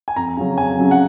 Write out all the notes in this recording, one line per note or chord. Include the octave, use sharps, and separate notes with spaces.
G#5
F2 A#5
C#3 F#3 C#4
F2 G#5
C#3 F#3 C#4
F#5